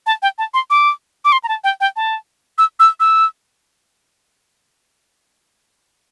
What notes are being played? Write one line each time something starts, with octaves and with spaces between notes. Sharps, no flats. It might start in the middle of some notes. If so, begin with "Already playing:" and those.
A5
G5
A5
C6
D6
D6
C6
A#5
A5
G5
G5
A5
E6
E6
E6